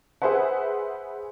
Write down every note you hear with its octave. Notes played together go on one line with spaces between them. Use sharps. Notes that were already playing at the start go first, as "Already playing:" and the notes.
G#4 B4 C5 E5 F#5